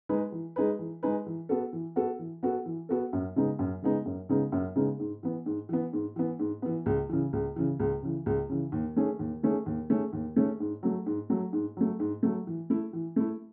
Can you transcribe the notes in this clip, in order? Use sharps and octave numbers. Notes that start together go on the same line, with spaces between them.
G#3 D#4 G#4 B4
E3
G#3 D#4 G#4 B4
E3
G#3 D#4 G#4 B4
E3
B3 F#4 A4
E3
B3 F#4 A4
E3
B3 F#4 A4
E3
B3 F#4 A4
F#2
C#3 G#3 B3 D#4
F#2
C#3 G#3 B3 D#4
F#2
C#3 G#3 B3 D#4
F#2
C#3 G#3 B3 D#4
G#2
E3 B3
G#2
E3 B3
G#2
E3 B3
G#2
E3 B3
C#2
C#3 E3
C#2
C#3 E3
C#2
C#3 E3
C#2
C#3 E3
D#2
D#3 A3 C#4 G#4
D#2
D#3 A3 C#4 G#4
D#2
D#3 A3 C#4 G#4
D#2
D#3 A3 C#4 G#4
G#2
F#3 A3
G#2
F#3 A3
G#2
F#3 A3
G#2
F#3 A3
E3
A3 E4
E3
A3 E4